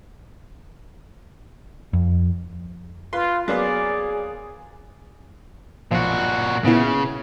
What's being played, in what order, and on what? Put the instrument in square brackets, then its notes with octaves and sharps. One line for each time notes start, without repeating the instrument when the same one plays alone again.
[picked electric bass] F2
[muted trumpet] F4 [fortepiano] B4 C6
[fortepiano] F#3 A#3 B3 [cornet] G#4 [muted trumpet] D5
[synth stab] B1 F3 [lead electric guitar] A#2 F#4
[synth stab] A#2 B3 E4 [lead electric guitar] C#3